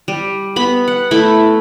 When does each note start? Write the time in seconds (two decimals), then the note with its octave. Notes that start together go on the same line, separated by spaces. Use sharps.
0.08 G3
0.56 B3 B5
0.88 F#5
1.11 A3 E4 F#5 B5